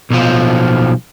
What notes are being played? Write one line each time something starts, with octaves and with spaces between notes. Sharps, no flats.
B1 F3